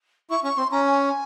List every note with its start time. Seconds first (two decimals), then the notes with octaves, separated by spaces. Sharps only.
0.30 E4 C#6
0.44 C#4 C#6
0.58 C4 C6
0.72 C#4 A#5
0.85 G#5